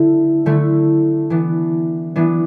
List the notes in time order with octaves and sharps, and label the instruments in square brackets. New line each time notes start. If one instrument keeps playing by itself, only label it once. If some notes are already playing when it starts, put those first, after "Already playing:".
Already playing: [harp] D3 A3 E4
D3 A3 E4
E3 B3 D4
E3 B3 D4